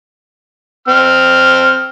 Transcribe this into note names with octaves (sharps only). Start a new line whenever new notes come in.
C4 F6